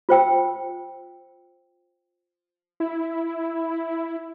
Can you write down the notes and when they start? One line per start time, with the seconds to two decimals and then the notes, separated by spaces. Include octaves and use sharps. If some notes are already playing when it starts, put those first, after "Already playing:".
0.09 F4 C5 G5 E6
2.80 E4